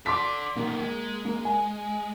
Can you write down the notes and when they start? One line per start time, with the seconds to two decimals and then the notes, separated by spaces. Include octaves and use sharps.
0.06 A4 D5 C6 D6 B6
0.56 B2 D#3 A#3
0.81 G#3
1.25 A#3
1.45 G#5